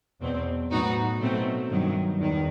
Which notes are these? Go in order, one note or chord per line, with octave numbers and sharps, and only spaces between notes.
E2 B2 F#3 C4
A2 F#3 B3 D#4 F#4
B2 F#3 A3 C4
G2 D#3 F#3
E2 D#3